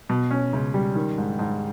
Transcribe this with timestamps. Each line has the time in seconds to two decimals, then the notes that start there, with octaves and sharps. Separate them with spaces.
0.09 B2
0.31 C#4
0.53 C#2
0.74 G3
0.95 D#3
1.18 G#2
1.39 G#2